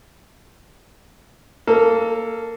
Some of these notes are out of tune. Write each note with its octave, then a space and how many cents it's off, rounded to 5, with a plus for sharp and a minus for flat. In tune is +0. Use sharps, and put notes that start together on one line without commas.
A#3 -15 A4 +5